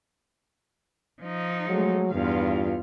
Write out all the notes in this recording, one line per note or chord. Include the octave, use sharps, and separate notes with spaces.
F3 D#4
F#3 G#3 A3
E2 G2 F4 F5